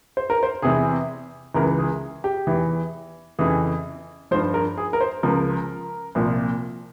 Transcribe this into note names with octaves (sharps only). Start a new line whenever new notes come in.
C5
A#4
C5
E2 C3 E3 G#4
C#2 C#3 E3 A#4
G#4
G4
E2 E3
F2 C#3 E3 G#4
G2 F3 C5
A#4
G#4
A#4
C5
C#2 C#3 F3 A#4
C2 A#2 F3